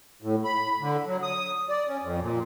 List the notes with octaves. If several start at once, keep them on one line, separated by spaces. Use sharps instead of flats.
A2
B5
D3
F#3
D#6
D5
C#4
F2
A#2